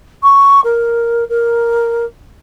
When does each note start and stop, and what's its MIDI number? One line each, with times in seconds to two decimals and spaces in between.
0.23 0.61 85
0.64 1.24 70
1.30 2.06 70